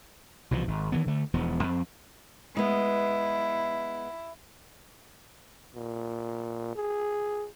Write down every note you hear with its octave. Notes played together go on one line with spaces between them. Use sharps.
C2 B2 E3 F3
G#1
D#3 E3 B3
D3 A3
E1 E2 F3 B3
F2 C4
G#3 B3 E4
A#2
G#4